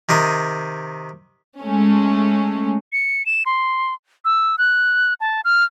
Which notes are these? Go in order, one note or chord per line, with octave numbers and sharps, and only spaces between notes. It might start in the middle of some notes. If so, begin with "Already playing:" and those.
C3 D#3 C5 D#6
G#3 A3 C#4
C#7
E7
C6
E6
F#6
A5
F6